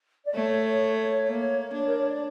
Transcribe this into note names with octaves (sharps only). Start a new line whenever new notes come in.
D5
A3 C#5
A#3
D4
A#4
C#5
D5